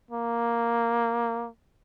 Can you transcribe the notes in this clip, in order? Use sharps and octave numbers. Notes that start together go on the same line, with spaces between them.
A#3